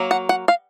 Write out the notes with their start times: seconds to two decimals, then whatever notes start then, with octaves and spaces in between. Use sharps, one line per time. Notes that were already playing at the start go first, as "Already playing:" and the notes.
Already playing: F#3 A#3
0.11 F#5
0.29 F#5
0.48 F5